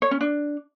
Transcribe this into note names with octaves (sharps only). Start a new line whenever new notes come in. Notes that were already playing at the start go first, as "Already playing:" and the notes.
C#5
C#4
D4